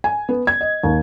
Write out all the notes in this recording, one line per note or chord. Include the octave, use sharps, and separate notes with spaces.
G#5
B3
G#6
D#5
D#2